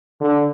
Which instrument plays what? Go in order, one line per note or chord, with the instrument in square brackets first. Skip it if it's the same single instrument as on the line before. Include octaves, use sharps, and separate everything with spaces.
[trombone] D3